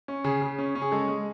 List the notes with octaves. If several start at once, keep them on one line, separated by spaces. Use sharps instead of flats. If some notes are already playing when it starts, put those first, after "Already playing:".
C#4
C#3 G#4
C#3
C#4
C#4
G#4
G#3 A4
G#3